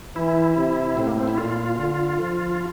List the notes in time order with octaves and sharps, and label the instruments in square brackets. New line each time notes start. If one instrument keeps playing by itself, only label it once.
[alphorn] E3 [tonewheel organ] E4
[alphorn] C3
[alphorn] A2 [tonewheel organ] C4
[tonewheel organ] A#3
C4
E4
[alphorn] A#2 [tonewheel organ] F4
[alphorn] D3
F3